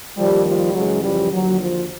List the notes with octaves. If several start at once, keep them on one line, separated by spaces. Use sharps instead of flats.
D#2 D#3 F3 G3
F3 G3
F#2 C#3 E3 F#3 G#3
F3 G3
D#2 D3 F3 F#3
F3